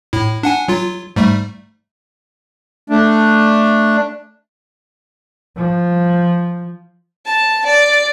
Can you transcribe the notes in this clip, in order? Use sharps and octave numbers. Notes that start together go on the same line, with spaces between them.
A2 E4
D4 F#5 G#5
F#3 F4
G#2 G3 A3
A3 D4
F3
A5
D5